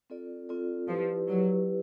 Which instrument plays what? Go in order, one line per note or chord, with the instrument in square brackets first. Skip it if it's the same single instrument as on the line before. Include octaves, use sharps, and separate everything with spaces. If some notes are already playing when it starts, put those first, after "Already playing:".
[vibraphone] C4 F4 A4 D5
C4 F4 A4 D5
[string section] F3 [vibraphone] E4 G4 B4 D5
[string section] F#3 [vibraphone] E4 G4 B4 D5